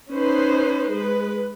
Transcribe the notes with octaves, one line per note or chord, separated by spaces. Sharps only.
C#4 D#4 B4 C5
G#3 B4